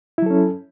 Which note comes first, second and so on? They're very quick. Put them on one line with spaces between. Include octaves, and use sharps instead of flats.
E4 F#3 A4 C#4